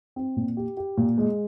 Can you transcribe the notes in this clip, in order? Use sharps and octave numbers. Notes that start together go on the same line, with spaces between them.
C4
A#2
G4
G4
A#2
G#3